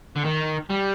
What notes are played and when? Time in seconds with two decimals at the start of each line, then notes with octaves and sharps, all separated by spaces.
0.16 D3
0.25 D#3
0.70 G3